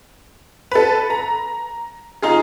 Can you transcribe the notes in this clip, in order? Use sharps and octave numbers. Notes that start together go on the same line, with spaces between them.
A4 B4
A#5
D#4 F4 G#4